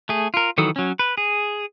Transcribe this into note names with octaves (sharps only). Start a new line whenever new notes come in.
A3 G#4
F4 A#4
D#3 E3 F#3 A4 D#6
F#3 C#4
B4
G#4